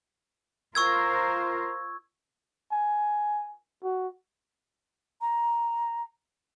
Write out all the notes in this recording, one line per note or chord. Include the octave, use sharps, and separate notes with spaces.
F4 A#4 C5 C#6 E6 G#6
G#5
F#4
A#5